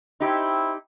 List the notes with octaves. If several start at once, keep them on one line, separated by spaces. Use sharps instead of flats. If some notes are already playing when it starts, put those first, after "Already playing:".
C4 D#4 E4 G4